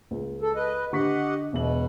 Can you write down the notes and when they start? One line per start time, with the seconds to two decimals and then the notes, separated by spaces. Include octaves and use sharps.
0.11 C#2
0.42 A4
0.55 B4 D#5
0.93 D3 G4 D#5 F#5 C#6 B6
1.53 E1 B2 E5 F#7